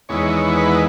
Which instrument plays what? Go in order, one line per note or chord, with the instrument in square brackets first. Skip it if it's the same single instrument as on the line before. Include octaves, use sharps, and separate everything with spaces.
[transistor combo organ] E2 D#3 G#3 B3 E4 C#5
B4